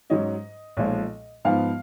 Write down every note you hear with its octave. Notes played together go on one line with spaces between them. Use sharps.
G#2 F#3 C#4 D#5
B1 A#2 F3 G#3
G#2 F3 B3 F5